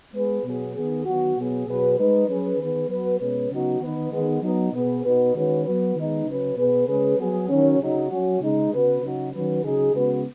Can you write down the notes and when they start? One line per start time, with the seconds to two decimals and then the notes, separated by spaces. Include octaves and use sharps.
0.13 G#3 B3 G#4 B4
0.44 B2 F#3 B3 G#4
0.74 D#3 B3 G#4
1.05 D#3 F#3 B3 F#4
1.36 B2 F#3 B3 G#4
1.67 B2 F#3 B3 G#4 B4
1.98 G#3 D#4 B4
2.28 F#3 C#4 G#4 B4
2.58 D#3 B3 G#4 B4
2.89 F#3 B3 F#4 B4
3.20 B2 G#3 C#4 B4
3.51 C#3 F#3 B3 D#4 F#4
3.81 D#3 B3 D#4 B4
4.12 D#3 G#3 B3
4.42 F#3 B3 D#4
4.73 B2 B3 G#4 B4
5.03 B2 B3 D#4 F#4 B4
5.34 D#3 G#3 C#4 F#4 B4
5.64 F#3 B3 F#4 B4
5.96 D#3 G#3 B3 D#4 B4
6.26 C#3 F#3 C#4 B4
6.57 B2 B3 G#4 B4
6.87 C#3 G#3 C#4 G#4 B4
7.18 F#3 B3 G#4
7.49 D#3 F#3 C#4
7.79 C#3 F#3 D#4
8.10 F#3 C#4 F#4
8.40 C#3 G#3 D#4
8.71 C#3 B3 F#4 B4
9.02 C#3 F#3 D#4 F#4
9.32 D#3 F#3 C#4 F#4 B4
9.63 C#3 F#3 D#4 G#4
9.93 C#3 G#3 B3 F#4 B4